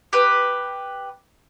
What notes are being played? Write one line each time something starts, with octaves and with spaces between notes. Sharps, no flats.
G4 B4